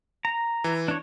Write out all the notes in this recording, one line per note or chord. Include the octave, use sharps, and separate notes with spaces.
A#5
E3
D4 C#5